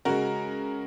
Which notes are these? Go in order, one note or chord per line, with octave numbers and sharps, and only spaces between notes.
C#3 G#3 F#4 A#4